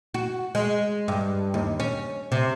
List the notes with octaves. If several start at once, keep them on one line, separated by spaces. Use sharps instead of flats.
F#4
G#3
G2
D#2
C#4
C3